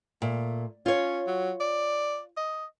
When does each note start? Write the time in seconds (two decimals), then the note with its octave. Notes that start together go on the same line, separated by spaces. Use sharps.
0.22 A#2 A3
0.86 C#4 F4 C#5
1.27 F#3
1.60 D5
2.37 D#5